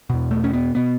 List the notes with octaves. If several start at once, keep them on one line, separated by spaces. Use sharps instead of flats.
E2 B2
A3
C#4
B3
B2 B3